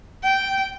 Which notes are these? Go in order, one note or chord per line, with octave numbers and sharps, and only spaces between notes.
G5